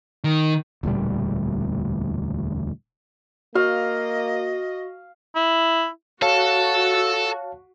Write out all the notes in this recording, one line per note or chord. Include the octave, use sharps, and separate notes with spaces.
D#3
E1 D2 A#2 G3
A#3 F#4 D#5 F5
E4
F#4 A4 C#5 F5 A5